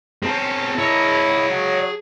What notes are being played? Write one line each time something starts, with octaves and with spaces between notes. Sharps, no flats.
C4 C#4 G#4 A5
E4 C#5 D#5
F#3